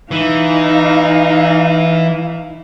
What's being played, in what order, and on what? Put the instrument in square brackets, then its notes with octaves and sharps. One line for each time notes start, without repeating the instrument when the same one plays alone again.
[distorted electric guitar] E3 [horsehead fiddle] D#4 F5